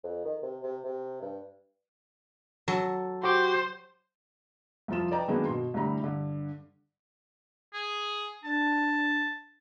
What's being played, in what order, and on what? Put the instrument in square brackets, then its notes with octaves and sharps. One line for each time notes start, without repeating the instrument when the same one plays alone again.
[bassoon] F2
D#3
C3
C3
C3
G2
[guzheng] F#3 [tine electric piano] A4
[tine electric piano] F#4 G4 D6 [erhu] C5
[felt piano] C2 F2 F3 F4 E7
A4 B4 D5 D#5 G5 A#5
F#2 D#3 G#3 A#3 B3 D4
B2 C6
C2 A2 D3 G3 A#5 B5
G2 D3
[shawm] G#4
[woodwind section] D4 [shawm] A5